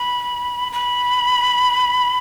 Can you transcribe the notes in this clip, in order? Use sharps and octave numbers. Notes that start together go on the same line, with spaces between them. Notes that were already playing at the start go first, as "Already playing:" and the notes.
Already playing: B5
B5